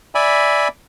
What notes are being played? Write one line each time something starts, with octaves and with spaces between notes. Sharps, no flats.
D5 E5 G#5 B5